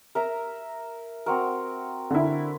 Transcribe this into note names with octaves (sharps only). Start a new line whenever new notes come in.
A#4 E5 A#5
C4 F#4 A#4
D3 E4